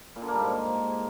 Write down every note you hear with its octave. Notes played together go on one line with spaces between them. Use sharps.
A#2
D3
A#3
G3
G#2